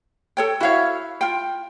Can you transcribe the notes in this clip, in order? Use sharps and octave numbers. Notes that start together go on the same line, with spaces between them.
A4 C#5 G5
E4 F#4 C#5 F5
F4 G5